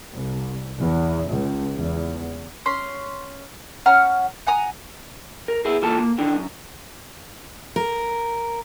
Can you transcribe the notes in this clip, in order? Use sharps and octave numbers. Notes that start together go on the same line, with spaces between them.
C2
E2
C#2
E2
C#4 C6
C#4 F#5 A#5 F6
F#5 G#5 A#5 D#6
A#4
B3 E4 G#4
E3 A#3 F4 A4 A5
A#3
D#3 E3 D4
F#2
A#4